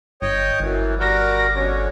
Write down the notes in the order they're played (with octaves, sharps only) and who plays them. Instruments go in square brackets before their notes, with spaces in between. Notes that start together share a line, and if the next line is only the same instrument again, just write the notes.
[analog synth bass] G1 [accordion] C#5 D#5 G5
[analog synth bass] G1 [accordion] F#2 E3
[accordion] G3 F#4 A#4 [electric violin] D6 A#6
[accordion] B2 D3 C#4